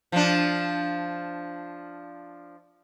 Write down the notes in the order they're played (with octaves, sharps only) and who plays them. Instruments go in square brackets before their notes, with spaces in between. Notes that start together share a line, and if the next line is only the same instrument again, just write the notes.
[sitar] F3 D4